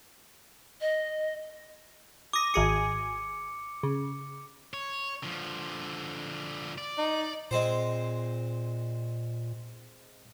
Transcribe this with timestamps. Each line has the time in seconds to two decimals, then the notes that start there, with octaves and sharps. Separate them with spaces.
0.81 D#5
2.33 D6 D#6 A#6
2.54 G#1 G#4 G#5 C#7
3.83 C#3
4.74 C#5
5.23 D3 F3
6.78 D5
6.98 D#4
7.51 A#2 G#3 C4 C5